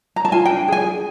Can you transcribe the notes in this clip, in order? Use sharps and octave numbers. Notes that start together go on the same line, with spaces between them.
A#5
A5
F4 G#5
G5
D4
G#4 G#5
G#4